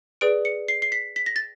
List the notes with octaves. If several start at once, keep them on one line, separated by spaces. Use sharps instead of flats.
G#4 B4 D5 D7
C#7
C7
C7
B6
B6
A#6
A6